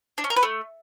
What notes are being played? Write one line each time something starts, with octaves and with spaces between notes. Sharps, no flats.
D4
C#4
A#4
B4
A3